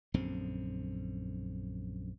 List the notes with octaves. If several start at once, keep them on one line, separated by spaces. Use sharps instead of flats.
A#1 F#2 D3 C4